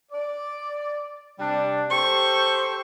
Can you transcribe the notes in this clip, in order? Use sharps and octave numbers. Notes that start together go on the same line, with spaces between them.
D5
C3 G3 D4
G4 A4 C5 C#6